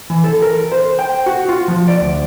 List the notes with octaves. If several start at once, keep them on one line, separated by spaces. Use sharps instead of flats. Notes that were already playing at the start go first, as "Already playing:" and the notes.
E3
A4
A#4
C5
G5
F#4
F4
F3
D5
D2